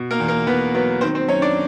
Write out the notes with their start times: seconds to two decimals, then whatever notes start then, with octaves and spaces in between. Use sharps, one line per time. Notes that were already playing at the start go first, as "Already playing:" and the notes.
Already playing: B2
0.11 A#3 A#4
0.20 E2
0.28 A#3 A#4
0.47 E2 B3 B4
0.74 F#3 B3 B4
1.01 D#3 C4 C5
1.15 C4 C5
1.28 F#2 C#4 C#5
1.42 D4 D5